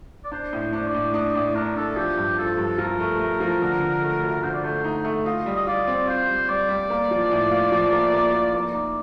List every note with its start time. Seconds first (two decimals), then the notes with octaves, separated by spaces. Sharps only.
0.24 D5
0.32 D4 C5
0.53 A2
0.60 C5
0.73 D4 C5
0.87 D5
0.94 A2
1.14 D4 D#5
1.35 A2 D5
1.55 D4 A#4
1.76 D4 A4
1.97 F3 G4
2.17 G2
2.38 F3 A4
2.58 G2
2.78 F3 A#4
3.00 A3
3.19 A3
3.40 F3
3.62 D3
3.82 D3
4.02 A3
4.22 D2
4.43 D3 C5
4.54 D5
4.64 A3 C5
4.84 D#4
5.05 A3
5.26 F4 D#5
5.46 G3
5.56 D#5
5.67 F4 D5
5.87 C4
6.08 F4 C5
6.29 G3
6.48 G3 D5
6.69 G3
6.90 A#3
7.11 F3
7.31 A2
7.51 F4
7.72 F3
7.93 A#3
8.14 A#3
8.34 F3
8.54 A#3 D5
8.74 D#4